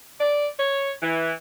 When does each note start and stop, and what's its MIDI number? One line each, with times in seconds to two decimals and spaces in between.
0.21 0.48 74
0.59 0.91 73
1.02 1.32 52